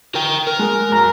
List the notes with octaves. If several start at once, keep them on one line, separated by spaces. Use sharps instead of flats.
A#4 G5
A#4
G#3
F#2 F#3 A#5